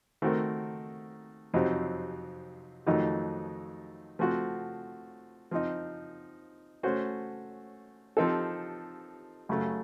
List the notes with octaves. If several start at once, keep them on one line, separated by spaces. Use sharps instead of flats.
D#3 A3 C4 F#4 A#4
F2 C3 F#3 C4 D#4
F2 D#3 F#3 A3 D#4
F3 A3 C4 F#4
F3 C4 D#4
A3 C#4 F#4 C5
F3 C4 D#4 A4
F#2 C#3 A3